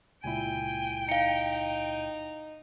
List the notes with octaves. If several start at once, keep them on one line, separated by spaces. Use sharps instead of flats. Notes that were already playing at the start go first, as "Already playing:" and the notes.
C#2 A#2 E4 G5 G#5
D#4 F5 C#7